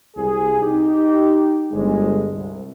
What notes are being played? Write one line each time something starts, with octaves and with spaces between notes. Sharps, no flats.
C2 G#4
D#4 G4
G1 G#3
C2